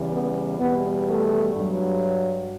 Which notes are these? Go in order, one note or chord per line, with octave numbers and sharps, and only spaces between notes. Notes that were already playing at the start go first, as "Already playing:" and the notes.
Already playing: E2 C#3 E3 G3
B3
E2 B2 G3 B3
A3
G2 F#3